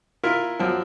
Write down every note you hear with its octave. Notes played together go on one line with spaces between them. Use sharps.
E4 F4 A#4 E5
F#2 F3